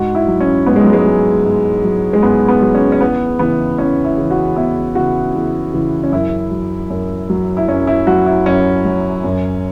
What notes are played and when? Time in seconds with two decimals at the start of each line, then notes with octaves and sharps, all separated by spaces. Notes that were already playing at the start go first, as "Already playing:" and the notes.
Already playing: G#2 F#4
0.15 E4
0.28 F#3
0.40 C#4
0.66 G#2 B3
0.76 G#3
0.84 F#3
0.93 G#3
1.06 F#3
1.44 G#2
1.84 F#3
2.13 G#3
2.23 G#2 B3
2.49 B3
2.62 F#3
2.75 C#4
2.92 C#4
3.00 E2 B3
3.39 C#3 E3 B3
3.78 E2 C#4
4.05 E4
4.17 C#3 E3
4.31 F#4
4.56 E2 E4
4.95 C#3 E3 F#4
5.35 E2
5.74 C#3 E3
6.04 C#4
6.12 F#2 E4
6.51 F#3
6.90 F#2
7.30 F#3
7.57 E4
7.68 F#2 C#4
7.87 E4
8.07 F#3 F#4
8.26 E4
8.46 F#2 C#4
8.85 F#3
9.24 F#2